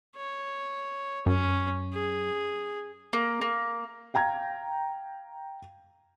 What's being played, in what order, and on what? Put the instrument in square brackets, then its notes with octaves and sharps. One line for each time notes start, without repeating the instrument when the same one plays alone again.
[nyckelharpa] C#5
[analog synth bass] F#2 [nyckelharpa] C#4
[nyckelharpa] G#4
[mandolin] A#3
A#3
[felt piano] F5 G5 A#5 G#6